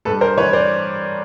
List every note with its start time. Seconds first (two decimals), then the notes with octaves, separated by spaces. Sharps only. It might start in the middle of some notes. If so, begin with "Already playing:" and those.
0.05 G2 A4 B4
0.21 A#4 C5
0.37 E3 B4 C#5
0.53 C5 D5